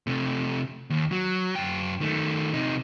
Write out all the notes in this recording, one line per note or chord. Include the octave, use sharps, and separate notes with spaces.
C3 A3
D#2
F#3
F#2 G5
D#3 A3
C3 D#4